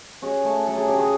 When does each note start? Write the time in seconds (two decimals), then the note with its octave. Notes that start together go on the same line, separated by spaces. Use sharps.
0.22 C#4 F#4 G#4
0.44 A3
0.66 F#3 A4
0.77 G#4
0.88 C#3 G4
0.98 F#4 G#4